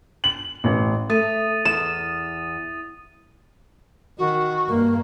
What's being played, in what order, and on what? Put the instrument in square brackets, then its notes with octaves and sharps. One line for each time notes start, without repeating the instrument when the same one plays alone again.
[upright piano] F#7
A1
[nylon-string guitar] A3 [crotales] D#6 A6 D#7
[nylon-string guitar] E2 [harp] E7
[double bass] D#3 [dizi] F#4
[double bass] G2 A#3